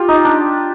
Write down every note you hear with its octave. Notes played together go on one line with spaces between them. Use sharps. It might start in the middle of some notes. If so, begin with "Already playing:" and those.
Already playing: F4 G4
D#4
D4